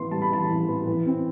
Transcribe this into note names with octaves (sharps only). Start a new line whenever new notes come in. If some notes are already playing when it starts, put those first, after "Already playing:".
Already playing: E3 B3 C6
G3 A5
B5
E3 A5
E3
B3
E3
C4